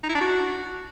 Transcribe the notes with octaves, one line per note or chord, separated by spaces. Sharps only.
D#4
E4
D4
F#4